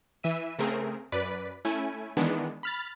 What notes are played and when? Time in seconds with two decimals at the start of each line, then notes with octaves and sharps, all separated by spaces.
0.23 E3 E5 D#7
0.59 C#3 A3 C4 G#4 A#4
1.12 F#2 B4 D5 B6
1.65 A3 C#4 E4 G#5
2.17 D#3 E3 G#3 B3 D4
2.63 B5 F6 A6